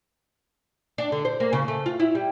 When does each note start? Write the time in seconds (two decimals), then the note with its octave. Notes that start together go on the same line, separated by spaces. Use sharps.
0.98 D4
1.12 D3
1.25 C5
1.40 A#3
1.53 C#3
1.68 A3
1.86 F4
2.00 E4
2.15 G3